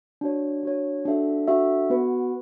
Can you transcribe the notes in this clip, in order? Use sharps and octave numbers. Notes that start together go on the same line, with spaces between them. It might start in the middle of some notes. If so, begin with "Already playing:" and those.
D4 F#4 C#5
D4 F#4 C#5
D4 F#4 A4 E5
D4 F#4 A4 E5
B3 F#4 B4